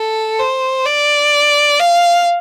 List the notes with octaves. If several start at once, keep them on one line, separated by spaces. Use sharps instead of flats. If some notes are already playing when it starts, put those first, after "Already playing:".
Already playing: A4
C5
D5
F5